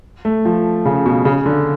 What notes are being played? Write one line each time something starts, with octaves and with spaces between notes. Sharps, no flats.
A3
F3
C#3
B2
C#3
D3